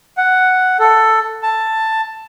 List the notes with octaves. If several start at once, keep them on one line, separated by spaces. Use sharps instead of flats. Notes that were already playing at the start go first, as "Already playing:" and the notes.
F#5
A4
A5